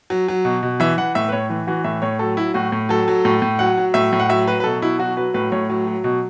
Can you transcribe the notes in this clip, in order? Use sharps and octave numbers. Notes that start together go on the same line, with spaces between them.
F#3
F#3
B2
B2
E3 E5
E3 F#5
A2 E5
B4
A2 C#5
E3
E3 F#4
A2 E5
A2 C#5
F#3 A4
F#3 E4
A2 F#4
A2
F#3 A4
F#3
A2
A2
F#3 F#5
F#3
A2 E5
A2
F#5
F#3 E5
F#3 B4
B4
B2 A4
B2 E4
F#3 F#4
F#3 B4
A2 B4
A2 C#5
F#3
F#3
B2